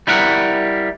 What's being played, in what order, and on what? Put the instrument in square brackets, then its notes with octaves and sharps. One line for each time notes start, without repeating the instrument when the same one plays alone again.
[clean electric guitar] G3 E4 A#4 F#5